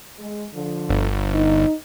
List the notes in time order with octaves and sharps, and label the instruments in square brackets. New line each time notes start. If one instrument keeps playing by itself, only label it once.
[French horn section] G#3
D3 F3
[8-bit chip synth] G1
[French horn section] D#4